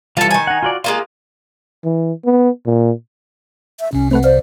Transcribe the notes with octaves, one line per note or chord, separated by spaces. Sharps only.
E3 G3 F4 A4 A5
D#3 G#5
D#4 F#5
F4 F#4 D5
G#3 A#3 F4 C6 D#6
E3
B3
A#2
E5
C2 C3 C#4
A3 C4 B4 F#5
C5 D5 F5